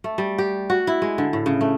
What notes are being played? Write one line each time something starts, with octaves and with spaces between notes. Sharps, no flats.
A3
G3
G4
F#4
E4
G#3
D3
A2
C#3
A3